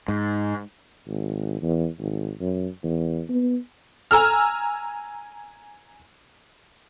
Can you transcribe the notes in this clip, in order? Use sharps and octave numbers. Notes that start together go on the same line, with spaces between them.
G#2
G#1
E2
G#1
F#2
E2
B3
G#5 A#5 E6 F6